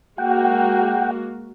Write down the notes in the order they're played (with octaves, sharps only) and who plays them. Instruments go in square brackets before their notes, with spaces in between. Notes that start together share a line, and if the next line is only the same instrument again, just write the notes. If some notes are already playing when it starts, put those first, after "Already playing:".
[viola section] G#3 A#3 F#4 [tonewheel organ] F#5 G5